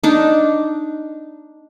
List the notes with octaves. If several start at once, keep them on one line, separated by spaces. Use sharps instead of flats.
D4 D#4